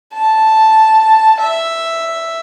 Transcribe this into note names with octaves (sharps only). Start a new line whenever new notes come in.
A5
E5